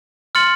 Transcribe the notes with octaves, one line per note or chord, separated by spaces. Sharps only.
C6 F6 A6 C#7 F#7